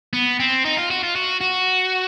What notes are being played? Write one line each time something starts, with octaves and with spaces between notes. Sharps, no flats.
B3
C4
D#4
F4
F#4
F4
F#4
F#4